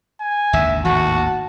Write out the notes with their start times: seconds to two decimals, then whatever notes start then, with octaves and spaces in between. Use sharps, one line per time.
0.21 G#5
0.53 G#1 D#2 D3 E5
0.85 G#1 D#2 A2 F#4 A5